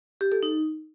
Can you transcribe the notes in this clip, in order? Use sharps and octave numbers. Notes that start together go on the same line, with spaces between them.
G4
A4
D#4